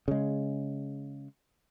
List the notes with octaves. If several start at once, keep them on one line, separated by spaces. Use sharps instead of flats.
C#3 G#3